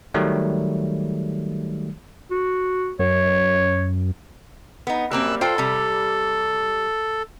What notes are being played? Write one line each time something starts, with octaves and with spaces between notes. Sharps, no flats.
D#3 F#3 G3 A3
F#4
F#2 C#5
B3 D#4
F#2 G3 A#3 C4 E6 F#6
F4 A4 C5 G5
C3 G3